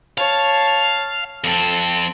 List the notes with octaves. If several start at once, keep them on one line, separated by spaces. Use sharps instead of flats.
C#5 F5 A5
F2 C4 A4